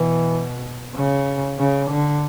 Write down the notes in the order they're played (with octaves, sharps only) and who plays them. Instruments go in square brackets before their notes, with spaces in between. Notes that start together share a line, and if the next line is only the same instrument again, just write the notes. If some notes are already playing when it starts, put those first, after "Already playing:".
Already playing: [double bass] B2 [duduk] E3
[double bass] C#3
C#3
D3